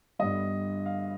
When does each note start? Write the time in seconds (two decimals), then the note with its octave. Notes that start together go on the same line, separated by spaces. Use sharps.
0.19 G1 G2 D3 G3 D#5
0.86 F5